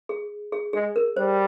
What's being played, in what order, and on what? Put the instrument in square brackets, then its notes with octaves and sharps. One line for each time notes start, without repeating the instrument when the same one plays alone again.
[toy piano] G#4
G#4
[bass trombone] G#3 [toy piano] G#4
[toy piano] A#4
[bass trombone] G3 [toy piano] C5